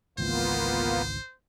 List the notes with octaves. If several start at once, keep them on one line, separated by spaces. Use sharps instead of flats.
G#1 C#2 E3 A#3 B3 F4 C5